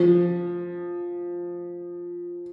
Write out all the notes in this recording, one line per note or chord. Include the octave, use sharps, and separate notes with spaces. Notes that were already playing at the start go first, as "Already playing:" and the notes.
Already playing: F3